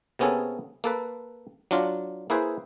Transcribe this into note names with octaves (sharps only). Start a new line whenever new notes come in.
C3 A#3 B3 C#4 G#4 A4
A#3 A4 B4
F#3 D4 F4
A#3 E4 G#4 B4 C5